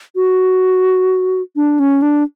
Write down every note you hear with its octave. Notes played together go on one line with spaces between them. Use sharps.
F#4
D4
C#4
D4